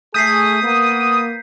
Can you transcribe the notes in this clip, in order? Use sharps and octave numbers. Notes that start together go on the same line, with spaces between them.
A3 G#4 D#6 G6 B6 C7
A#3 B3